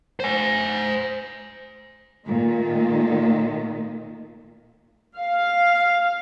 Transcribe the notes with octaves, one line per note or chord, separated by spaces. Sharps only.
C5 G#5
A#2 D#3 A3
F5